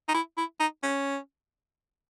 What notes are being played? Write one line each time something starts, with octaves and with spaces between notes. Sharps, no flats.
D#4
E4
E4
D#4
C#4